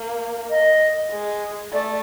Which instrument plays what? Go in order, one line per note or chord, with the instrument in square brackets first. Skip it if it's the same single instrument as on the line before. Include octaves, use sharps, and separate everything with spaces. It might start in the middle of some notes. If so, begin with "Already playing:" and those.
Already playing: [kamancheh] A#3
[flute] D#5
[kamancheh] G#3
[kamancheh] A3 [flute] D5